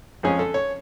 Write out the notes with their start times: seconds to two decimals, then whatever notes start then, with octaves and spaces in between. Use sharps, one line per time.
0.23 F2 F3 G#3 C#4 G#4
0.39 A4
0.54 C#5